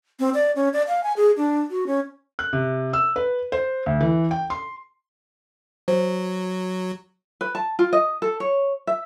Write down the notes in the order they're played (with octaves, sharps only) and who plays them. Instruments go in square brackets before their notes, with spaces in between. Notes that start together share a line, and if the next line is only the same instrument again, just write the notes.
[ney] C4
D5
C#4
D5
F5
G#5
G#4
D4
F#4
C#4
[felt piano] F#6
C3
E6
B4
C5
D2
E3
G5
C6
[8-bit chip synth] F#3 [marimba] C5
[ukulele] B4
A5
F4
D#5
A4
C#5
E5